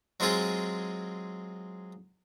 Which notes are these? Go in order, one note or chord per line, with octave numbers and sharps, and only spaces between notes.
F#3 G#3 C4 F4 G#4